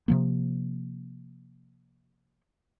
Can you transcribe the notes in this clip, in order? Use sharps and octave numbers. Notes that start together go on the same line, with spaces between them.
C3 F3 A#3